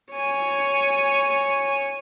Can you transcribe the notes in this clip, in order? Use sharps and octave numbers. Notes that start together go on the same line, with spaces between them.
C#5 G#5